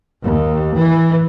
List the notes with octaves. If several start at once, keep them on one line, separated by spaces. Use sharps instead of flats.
D#2
E3